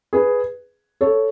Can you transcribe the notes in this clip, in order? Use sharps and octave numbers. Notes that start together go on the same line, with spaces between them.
G#4 B4
A4 C#5